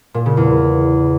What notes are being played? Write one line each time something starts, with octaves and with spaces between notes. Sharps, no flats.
A#2
C#3
E2